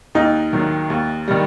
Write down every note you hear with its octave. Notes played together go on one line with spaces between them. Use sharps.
D#2 D#4
D#3 F#3
D#2
D#3 G3